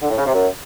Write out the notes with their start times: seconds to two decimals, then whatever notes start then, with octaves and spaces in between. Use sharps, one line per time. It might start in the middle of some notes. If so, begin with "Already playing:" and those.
0.02 D3
0.10 A2
0.18 C#3
0.26 C3
0.35 F#2